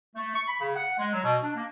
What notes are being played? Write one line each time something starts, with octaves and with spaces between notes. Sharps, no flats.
A3
C#6
B5
C#3
F#5
G#3
F#3
B2
D4
A#3